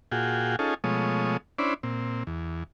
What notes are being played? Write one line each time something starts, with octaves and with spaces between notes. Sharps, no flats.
A#2 F4 F#4 G#4 G5
C#4 D#4 F4 G#4 A4
B2 F3 G#3 A3 C#5 D#6
C#4 D4 E4 C5 D5 B5
A#2 C4
E2